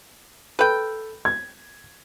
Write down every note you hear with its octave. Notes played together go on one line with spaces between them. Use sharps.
A4 B4 G5
G#6